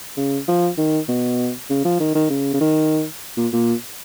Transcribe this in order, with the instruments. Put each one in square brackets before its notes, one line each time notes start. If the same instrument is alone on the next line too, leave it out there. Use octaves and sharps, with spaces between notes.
[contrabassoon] C#3
F3
D#3
B2
C#3
F3
D#3
D#3
C#3
C#3
D#3
A#2
A#2